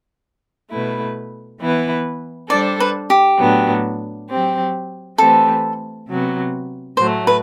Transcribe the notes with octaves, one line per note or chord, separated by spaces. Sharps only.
B2 A3 E4 B4
E3 B3 E4 B4
G3 D4 A4 C5 D5
B4
G4
A2 F#3 B3 D4
F#3 C4 G4
E3 A3 C4 G4 A4 B4
C3 F#3 B3
A2 F#3 A3 C5
B4